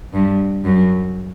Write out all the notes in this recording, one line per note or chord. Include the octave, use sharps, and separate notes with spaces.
G2
F#2